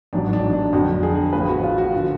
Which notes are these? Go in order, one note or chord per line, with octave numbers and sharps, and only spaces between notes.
A1 G#2 F#3 D4
D4
D4
F2 D3 F#3 F#4
G#4
A1 A2 F3 B4
F#4
F4
F#4
D3 F3